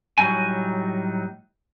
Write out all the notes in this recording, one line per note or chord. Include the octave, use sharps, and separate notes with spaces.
A2 F#3 G3 D#4 G#5